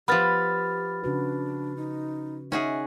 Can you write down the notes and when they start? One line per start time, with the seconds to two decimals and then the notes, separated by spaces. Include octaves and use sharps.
0.08 F3 B3 G4 B5 F6 A6
1.04 C#3 D4 F#4 B4
1.77 D#4
2.52 C#4 D#4 F#4 G#4 E5